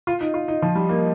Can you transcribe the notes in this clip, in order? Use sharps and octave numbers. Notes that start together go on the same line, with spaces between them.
F4
D#4
F4
D#4
F3
G3
A#3